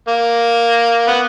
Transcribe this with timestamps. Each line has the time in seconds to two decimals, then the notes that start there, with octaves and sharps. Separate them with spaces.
0.08 A#3
1.07 B3